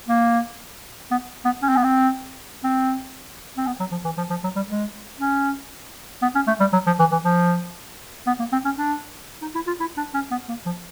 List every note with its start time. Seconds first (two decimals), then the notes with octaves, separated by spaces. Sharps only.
0.09 A#3
1.11 B3
1.45 B3
1.63 C#4
1.69 C4
1.77 B3
1.84 C4
2.64 C4
3.57 C4
3.67 B3
3.80 F#3
3.92 F3
4.05 E3
4.18 F3
4.30 F3
4.44 F#3
4.56 G3
4.69 G#3
5.20 C#4
6.22 B3
6.35 C#4
6.47 A3
6.60 G3
6.73 F#3
6.86 F3
6.99 E3
7.12 E3
7.24 F3
8.27 B3
8.39 A#3
8.52 C4
8.65 C#4
8.78 D4
9.42 D#4
9.55 E4
9.67 F4
9.80 E4
9.97 D4
10.14 C#4
10.31 B3
10.49 A#3
10.66 F3